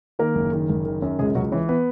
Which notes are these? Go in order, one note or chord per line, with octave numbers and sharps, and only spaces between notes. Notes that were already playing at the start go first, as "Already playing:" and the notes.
D#3 A#3 A#4
F#1
D#3
F#1
D#3
F#2
C#2 G#3 G#4
C#2 F#3 F#4
E3 C#4
B3 B4